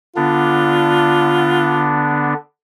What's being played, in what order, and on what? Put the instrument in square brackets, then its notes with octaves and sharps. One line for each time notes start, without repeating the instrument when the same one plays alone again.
[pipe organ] D3 B3 D4 [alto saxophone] F4